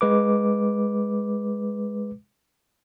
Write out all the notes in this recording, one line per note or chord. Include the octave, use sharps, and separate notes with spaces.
G#3 B4 D6